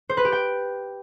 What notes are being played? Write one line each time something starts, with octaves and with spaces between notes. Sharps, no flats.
C5
B4
G4
G5